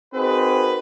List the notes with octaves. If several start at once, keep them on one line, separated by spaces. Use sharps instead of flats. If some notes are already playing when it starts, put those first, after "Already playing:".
C4 D#4 F#4 G#4 A#4 B4